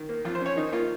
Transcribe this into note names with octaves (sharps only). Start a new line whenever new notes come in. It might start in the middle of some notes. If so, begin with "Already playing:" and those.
Already playing: D#3
A#3
F2 F4
C5
C#4
C#5
D#3 D#4
A#3 F4